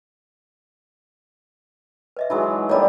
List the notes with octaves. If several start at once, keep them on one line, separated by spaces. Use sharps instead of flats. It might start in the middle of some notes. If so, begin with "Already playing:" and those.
B4 D#5 E5
E3 F#3 G#3 D#4 E5
D3 G3 A#3 C#5 D#5 A#5